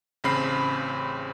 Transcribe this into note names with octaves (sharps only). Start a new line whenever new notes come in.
A1 C#3 C4 B5 C7